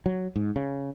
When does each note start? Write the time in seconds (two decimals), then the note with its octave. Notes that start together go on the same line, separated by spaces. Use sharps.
0.06 F#3
0.36 G#2
0.56 C#3